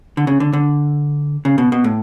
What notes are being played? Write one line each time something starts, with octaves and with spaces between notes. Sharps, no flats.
D3
C#3
D3
D3
C#3
B2
B2
A2